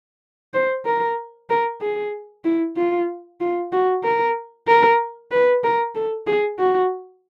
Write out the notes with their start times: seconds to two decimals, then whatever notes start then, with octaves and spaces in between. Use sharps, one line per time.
0.54 C5
0.85 A#4
1.50 A#4
1.81 G#4
2.45 E4
2.77 F4
3.40 F4
3.72 F#4
4.04 A#4
4.68 A#4
5.31 B4
5.63 A#4
5.95 A4
6.27 G#4
6.59 F#4